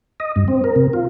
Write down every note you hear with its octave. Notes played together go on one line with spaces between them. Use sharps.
D#5
G2
C4
A#4
C3
F4